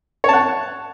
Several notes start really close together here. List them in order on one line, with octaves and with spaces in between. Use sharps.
C#5 A5 F#5